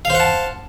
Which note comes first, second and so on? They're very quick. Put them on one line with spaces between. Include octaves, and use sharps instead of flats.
F5 C5 F#5 A5